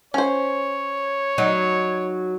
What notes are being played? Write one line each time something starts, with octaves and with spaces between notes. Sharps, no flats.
C#4 C5 C#5
F#3 D#4